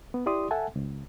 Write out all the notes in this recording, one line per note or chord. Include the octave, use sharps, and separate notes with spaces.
B3
E4 G4 D5 C6 D#6
A4 E5 F#5 G#5 A5
C#2